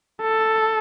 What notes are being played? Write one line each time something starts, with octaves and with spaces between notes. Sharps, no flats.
A4